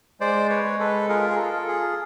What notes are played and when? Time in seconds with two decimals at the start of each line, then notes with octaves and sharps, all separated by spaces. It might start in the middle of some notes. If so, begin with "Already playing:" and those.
0.20 G#3 C5 D5
0.50 B4 C#5
0.65 G#3
0.79 A4 B4
1.09 F4 G#4 A#4
1.30 G#4
1.38 A4
1.53 F4
1.68 G#4